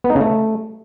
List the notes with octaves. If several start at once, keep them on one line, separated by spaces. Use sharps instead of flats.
B3
D#4
C#3
A3